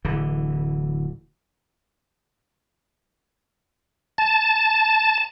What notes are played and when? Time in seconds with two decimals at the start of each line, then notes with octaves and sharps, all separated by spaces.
0.05 D1 D3 E3
4.18 A5